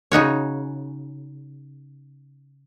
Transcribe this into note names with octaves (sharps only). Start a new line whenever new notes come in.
C#3 D#4 F#4 C#5